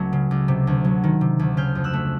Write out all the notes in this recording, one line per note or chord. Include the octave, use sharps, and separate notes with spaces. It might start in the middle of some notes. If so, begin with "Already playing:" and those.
Already playing: C#2 F#3 A3 E6
C#3
C#2
C3
D2
F#3
D#3
C3
D2
C#3 F6 G6
F2
E6 F#6
A3